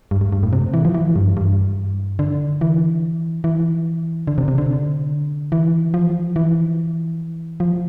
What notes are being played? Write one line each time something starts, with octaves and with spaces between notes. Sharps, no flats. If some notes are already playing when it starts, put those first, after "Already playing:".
G2
G2
G2
A2
C3
E3
F3
E3
G2
G2
D3
E3
E3
D3
C3
C3
D3
E3
F3
E3
F3